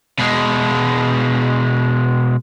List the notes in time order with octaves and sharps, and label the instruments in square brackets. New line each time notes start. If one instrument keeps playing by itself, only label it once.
[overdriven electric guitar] B2 G#3